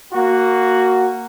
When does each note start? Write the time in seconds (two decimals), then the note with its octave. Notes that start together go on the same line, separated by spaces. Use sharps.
0.13 A#3 F#4